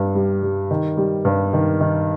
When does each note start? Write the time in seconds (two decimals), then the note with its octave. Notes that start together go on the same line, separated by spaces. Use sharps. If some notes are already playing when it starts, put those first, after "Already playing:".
Already playing: G2 G3
0.15 G3
0.43 G3
0.71 D#3
0.97 G3
1.25 G2
1.53 D#3
1.80 D#3